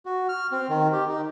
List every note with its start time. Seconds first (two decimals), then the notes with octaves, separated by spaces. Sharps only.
0.06 F#4
0.29 F6
0.52 C4
0.69 D#3
0.93 G4
1.09 D#4